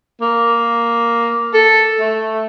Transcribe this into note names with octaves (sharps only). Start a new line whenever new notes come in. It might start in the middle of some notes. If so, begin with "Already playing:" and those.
A#3
A4
A3